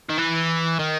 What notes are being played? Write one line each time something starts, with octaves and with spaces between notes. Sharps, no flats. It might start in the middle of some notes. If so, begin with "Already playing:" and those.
D#3
E3
D#3